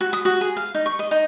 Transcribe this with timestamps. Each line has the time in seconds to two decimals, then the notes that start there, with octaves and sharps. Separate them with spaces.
0.01 F#4
0.13 D#6
0.25 F#4
0.41 G#4
0.57 F5
0.75 D#4
0.86 C#6
0.99 D#5
1.11 D#4